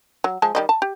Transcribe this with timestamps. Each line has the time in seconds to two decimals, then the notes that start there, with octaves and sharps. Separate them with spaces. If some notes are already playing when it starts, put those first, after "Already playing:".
0.24 F#3
0.42 F3 G#3 A5
0.55 D#3 G3 D#5
0.69 A5
0.82 G4